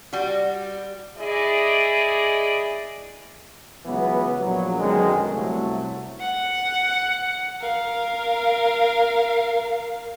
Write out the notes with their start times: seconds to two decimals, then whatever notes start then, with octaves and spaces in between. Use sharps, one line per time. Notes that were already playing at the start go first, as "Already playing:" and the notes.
0.13 G3 F#4
1.17 E4 G#4 D5 D#5
3.85 C#2 E3 F#3 B3
4.38 A#1 F#3
4.79 F#2 B2 D3 D#3 G#3
5.30 C2 F#3 A3
6.21 F#5
7.61 A#4 F5